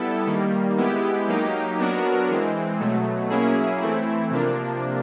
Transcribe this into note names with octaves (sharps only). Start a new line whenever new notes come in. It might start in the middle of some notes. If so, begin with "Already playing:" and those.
Already playing: G3 B3 E4 A4
D#3 G3 A#3
G#3 B3 E4 G4
F#3 A#3 D#4 G4
F#3 B3 D4 F#4 A#4
E3 G#3 C4
B2 F#3 A3
F#3 A#3 C#4 E4 G#4
E3 A3 C4 E4
C3 F3 A#3 D4